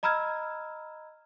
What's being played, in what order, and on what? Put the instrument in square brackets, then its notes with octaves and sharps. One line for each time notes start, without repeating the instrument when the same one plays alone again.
[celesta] D#5 A#5 B5 E6 F6 G#6